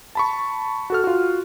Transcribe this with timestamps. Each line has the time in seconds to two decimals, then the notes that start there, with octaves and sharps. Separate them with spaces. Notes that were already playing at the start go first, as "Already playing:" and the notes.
0.15 A5 B5 C#6
0.90 F#4 A4 F6
1.04 F4 F#4